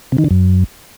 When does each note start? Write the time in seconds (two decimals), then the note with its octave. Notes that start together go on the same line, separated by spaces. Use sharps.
0.12 C3
0.18 D#3
0.24 D3
0.31 F#2